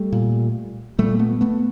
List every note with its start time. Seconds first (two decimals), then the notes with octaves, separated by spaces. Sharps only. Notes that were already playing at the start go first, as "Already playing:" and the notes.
Already playing: G3 A3
0.12 A#2
0.98 A#2 G3 A3
1.19 A3 B3
1.41 A3 B3